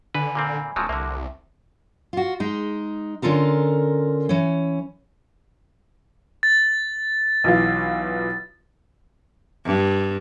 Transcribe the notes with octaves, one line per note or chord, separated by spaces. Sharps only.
D3 B4 G#5 B5
A#2 A#3 C4
D1 C#3 F3 F#3 A5 C6 A#6
C2 D3 A#3 E5
F4 F#4
G#3 D#4
D3 C#4 F4 A4 A#4
E3 C#4
A6
B1 E3 F4
G2